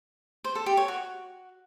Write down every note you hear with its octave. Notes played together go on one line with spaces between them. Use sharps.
C5
A4
G4
C#5
F#4